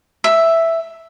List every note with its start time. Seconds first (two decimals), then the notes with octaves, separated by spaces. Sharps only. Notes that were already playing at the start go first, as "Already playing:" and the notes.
0.24 E5